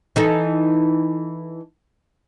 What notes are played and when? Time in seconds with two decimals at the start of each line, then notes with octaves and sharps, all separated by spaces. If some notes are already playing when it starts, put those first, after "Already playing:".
0.16 E3 D#4 A4